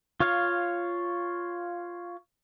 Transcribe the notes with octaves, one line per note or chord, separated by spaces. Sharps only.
F4 C#5 F5